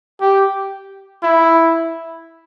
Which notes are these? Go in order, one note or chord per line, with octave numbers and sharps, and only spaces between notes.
G4
E4